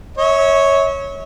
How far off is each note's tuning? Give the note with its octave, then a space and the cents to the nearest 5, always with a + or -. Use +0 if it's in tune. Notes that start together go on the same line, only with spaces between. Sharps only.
C#5 +0 E5 -40